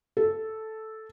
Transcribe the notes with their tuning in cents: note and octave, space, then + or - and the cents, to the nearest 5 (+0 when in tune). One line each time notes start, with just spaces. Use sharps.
A4 -5